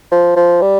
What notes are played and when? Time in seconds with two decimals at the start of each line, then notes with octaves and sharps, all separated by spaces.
0.12 F3
0.36 F3
0.62 G3